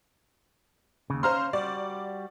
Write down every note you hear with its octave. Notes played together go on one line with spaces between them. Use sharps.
D#2 C#3
C#4 C5 F5 A#5 C6
G3 F#4 D5